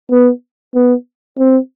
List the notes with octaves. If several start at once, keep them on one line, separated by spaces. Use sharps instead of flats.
B3
B3
C4